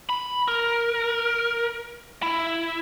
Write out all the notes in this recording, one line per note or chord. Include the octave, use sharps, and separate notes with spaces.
B5
A#4
E4